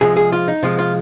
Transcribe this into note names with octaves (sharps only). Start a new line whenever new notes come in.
C3 F3 G#3 G#4
G#4
F4
D#4
C3 F3 G#3 F4
F4